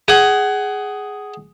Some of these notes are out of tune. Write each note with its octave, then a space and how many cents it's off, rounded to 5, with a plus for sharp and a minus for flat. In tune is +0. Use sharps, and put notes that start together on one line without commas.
G#4 +0 F#5 +25